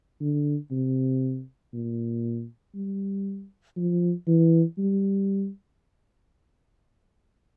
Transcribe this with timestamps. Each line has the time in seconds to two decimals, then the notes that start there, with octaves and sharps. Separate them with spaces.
0.21 D3
0.72 C3
1.74 A#2
2.75 G3
3.77 F3
4.27 E3
4.78 G3